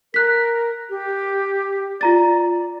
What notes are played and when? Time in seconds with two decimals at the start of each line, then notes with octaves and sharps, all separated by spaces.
0.14 A#4 F#6 B6
0.90 G4
2.01 F4 D5 A#5 A6